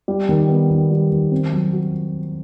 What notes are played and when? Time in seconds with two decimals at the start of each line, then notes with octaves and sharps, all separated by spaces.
0.08 G3
0.29 D#3
0.49 B3
0.71 D#3
0.91 G3
1.12 D#3
1.31 C4
1.52 F#3
1.73 F#4